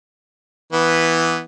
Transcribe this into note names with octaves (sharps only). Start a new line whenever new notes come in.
E3 B3